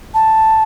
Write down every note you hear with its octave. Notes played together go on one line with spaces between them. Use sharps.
A5